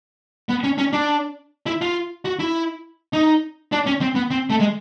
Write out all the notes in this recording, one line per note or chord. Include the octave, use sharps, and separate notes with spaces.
B3
C#4
C#4
D4
E4
F4
F#4
E4
D#4
D4
C#4
C4
B3
C4
A3
G#3